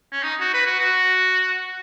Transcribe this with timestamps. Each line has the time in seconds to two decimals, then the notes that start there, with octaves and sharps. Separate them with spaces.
0.12 C#4
0.23 D#4
0.40 F#4
0.54 B4
0.66 F#4
0.80 F#4